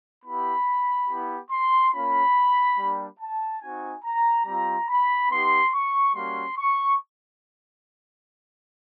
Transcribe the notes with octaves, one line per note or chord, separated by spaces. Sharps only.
B3 E4 G4 B5
B3 E4 G4
C6
A#3 C#4 F4 B5
G3 A#3 D4 G4
A5
C4 D#4 F#4 G#5
A#5
G3 C4 F4 A#5
B5
B3 D#4 G4 C6
C#6
G3 A#3 C#4 F#4 C6
C#6